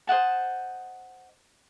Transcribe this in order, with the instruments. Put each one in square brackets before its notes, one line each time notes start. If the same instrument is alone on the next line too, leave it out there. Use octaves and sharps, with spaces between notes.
[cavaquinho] C5 D#5 F#5 A5